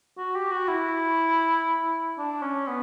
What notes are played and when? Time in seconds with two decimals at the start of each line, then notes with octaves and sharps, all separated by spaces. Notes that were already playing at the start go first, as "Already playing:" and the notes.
0.18 F#4
0.35 G4
0.51 F#4
0.68 E4
2.18 D4
2.42 C#4
2.68 B3